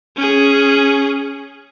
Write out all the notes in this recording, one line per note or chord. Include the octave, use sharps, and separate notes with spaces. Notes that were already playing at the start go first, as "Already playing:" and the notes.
C#4 G#4